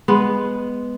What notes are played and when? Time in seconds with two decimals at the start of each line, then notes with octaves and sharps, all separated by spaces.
0.08 G#3 B3